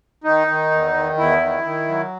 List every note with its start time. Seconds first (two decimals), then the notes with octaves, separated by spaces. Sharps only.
0.24 D#3 D#4
0.47 D#3
0.71 E2
0.94 D#3
1.17 E2 E4
1.41 D#3
1.64 D#3
1.88 F#3